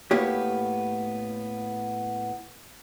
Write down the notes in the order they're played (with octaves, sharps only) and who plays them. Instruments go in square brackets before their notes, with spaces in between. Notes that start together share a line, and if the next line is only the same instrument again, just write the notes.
[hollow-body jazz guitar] A2 A#3 B3 G4 C#5